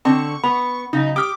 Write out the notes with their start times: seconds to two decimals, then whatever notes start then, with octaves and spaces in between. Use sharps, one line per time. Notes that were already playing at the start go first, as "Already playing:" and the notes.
0.05 D3 C4 A5 C#6
0.44 B3 B5
0.93 C#3 F#3 D#4
1.16 G4 D6 D#6 F6